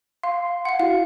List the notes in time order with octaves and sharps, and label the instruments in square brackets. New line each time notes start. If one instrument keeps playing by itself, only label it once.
[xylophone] F5 [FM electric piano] C6
[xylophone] F5 F#5
[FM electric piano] E4 F#4 [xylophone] F5